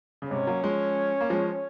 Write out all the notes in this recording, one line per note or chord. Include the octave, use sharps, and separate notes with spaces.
C#3
G#2 C3 C#4
F#3 A#3
F3 G#3
A#3
F3 G#3